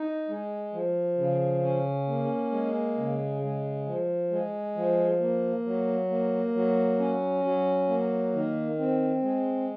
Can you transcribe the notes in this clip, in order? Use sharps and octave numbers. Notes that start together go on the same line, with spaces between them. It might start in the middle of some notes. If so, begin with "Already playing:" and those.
Already playing: D#4
G#3
F3
C#3
C#4
A#3
G#3
C#3
G#3
F3
G#3
F3
A#3
F#3
A#3
F#3
C#4
F#3
A#3
D#3
C4
G#3